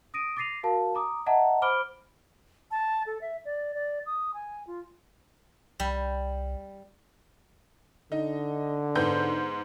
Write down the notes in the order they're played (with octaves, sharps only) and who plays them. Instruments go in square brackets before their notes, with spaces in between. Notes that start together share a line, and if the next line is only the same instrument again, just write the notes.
[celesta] D#6 A#6 D7 D#7
D6 A6 A#6 C7 D#7 F7
F#4 A#4 F5 A5
A#5 D6 D#6
D#5 E5 F#5 A5 A#5
C5 B5 D6 F6 D7 G7
[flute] A5
A4
E5
D5
D5
D#6
G#5
F4
[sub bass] C2 [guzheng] G3
[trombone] D3 [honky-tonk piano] D#4
[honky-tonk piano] G#2 B3 G6